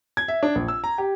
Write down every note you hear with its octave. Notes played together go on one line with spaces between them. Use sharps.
G#6
E5
D4
A#1
E6
A#5
G4